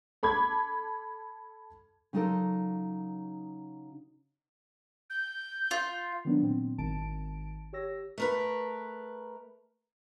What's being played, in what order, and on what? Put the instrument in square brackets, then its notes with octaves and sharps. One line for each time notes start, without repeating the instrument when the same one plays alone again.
[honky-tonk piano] A4 B5 D6 G#6
[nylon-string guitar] C#3 F#3 D#4 F4 A4 A#4
[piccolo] G6
[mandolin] F4
[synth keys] D#3 F#3 B3 D4
A#2 C4
G#1 D#3 A5 D7
G4 C#5 E6 A#6
[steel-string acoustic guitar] A3 A#4 B4